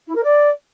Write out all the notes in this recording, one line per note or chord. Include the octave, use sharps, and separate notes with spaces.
E4
A#4
D5